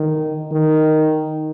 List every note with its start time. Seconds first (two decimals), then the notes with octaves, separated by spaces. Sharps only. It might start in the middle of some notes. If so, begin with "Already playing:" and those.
Already playing: D#3
0.52 D#3